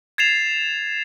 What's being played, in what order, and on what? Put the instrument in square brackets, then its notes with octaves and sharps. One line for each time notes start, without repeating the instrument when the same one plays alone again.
[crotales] G#6 A6 C7 E7 F7